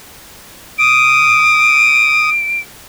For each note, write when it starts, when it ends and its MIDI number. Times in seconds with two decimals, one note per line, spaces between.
0.78 2.29 87
0.78 2.60 98